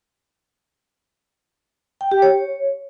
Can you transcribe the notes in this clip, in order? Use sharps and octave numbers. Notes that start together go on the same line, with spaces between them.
G5
G4
C#5